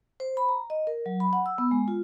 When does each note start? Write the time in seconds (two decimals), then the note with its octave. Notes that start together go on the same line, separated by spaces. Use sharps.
0.20 C5
0.37 B5
0.49 A#5
0.70 D#5
0.87 A#4
1.06 F#3
1.20 B5
1.33 F#5
1.46 E6
1.58 B3
1.71 G#3
1.88 F4